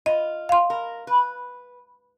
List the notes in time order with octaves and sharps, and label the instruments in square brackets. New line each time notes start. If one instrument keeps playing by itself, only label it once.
[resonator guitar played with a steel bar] F4 [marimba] D#5
[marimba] F5 C6
[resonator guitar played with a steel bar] A#4
B4